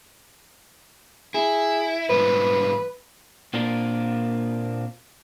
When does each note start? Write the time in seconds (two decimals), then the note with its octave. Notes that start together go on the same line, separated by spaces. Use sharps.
1.34 E4 G#4
2.10 G#2 E3 G3 B4
3.54 A#2 A#3 C4 D4 F4 A#4